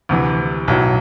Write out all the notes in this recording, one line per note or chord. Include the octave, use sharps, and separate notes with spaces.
D2 C3 E3
B1 A2 F#3